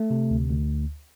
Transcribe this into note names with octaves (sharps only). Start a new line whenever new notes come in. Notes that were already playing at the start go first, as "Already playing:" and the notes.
Already playing: A3
C3
D2
D2